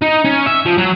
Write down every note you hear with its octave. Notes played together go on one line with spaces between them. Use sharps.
D#4
C#4
E5
F3
F#3